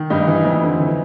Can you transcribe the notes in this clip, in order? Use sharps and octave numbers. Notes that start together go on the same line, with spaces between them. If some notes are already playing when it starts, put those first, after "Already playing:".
Already playing: D#3
G2 D#4
E3
F2
D3
E3